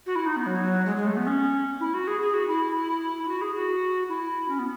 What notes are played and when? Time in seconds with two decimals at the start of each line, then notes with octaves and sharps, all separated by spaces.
0.06 F#4
0.16 E4
0.26 D#4
0.37 B3
0.46 F#3
0.86 G#3
0.97 G#3
1.07 A3
1.17 B3
1.27 C#4
1.80 E4
1.94 F#4
2.07 G#4
2.21 G#4
2.34 F#4
2.48 E4
3.23 E4
3.28 F#4
3.41 G#4
3.55 F#4
4.09 E4
4.49 C#4
4.59 B3